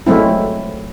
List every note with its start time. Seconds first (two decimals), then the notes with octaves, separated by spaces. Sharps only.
0.07 F#3 G#3 A3 C4 E4